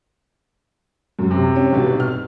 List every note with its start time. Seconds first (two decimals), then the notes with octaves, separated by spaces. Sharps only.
1.19 F#2
1.31 C3
1.56 C4 C#4
1.72 B1 G2 B2
2.00 F6